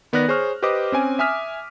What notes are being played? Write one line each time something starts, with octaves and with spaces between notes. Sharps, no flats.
D#3 B3 B4 D5 F#6 A#6
G#4 C5 C#5 C#6 F6
G4 B4 C5 D#5 D6 D#6
C4 C#4 G#5
E5 G#5 D#6 F6 B6